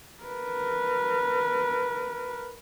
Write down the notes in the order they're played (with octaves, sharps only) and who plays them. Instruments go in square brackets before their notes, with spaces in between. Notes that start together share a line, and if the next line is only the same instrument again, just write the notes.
[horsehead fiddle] A#4 B4